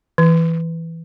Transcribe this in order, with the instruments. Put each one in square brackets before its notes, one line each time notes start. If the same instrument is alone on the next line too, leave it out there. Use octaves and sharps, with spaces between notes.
[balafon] E3